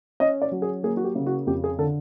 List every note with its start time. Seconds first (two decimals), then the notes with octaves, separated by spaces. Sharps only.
0.20 C#4 D#5
0.42 D5
0.52 F#3
0.62 G#4
0.83 A#3 G#4
0.97 F#4
1.04 G4
1.15 C#3
1.26 F#4
1.47 F2 G4
1.64 G#4
1.78 D3 A4